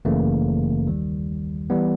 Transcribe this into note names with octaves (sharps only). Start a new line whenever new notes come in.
G1 F#2 C#3 E3 A3 A#3
D#2 D#3 G3
E3 G3 B3